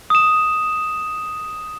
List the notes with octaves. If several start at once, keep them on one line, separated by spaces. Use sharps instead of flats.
D#6 E7